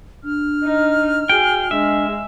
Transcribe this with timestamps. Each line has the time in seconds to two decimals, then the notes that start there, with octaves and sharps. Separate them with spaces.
0.24 D4 F6
0.64 D#4
1.29 F#4 G#4 G5
1.71 G#3 D4 E5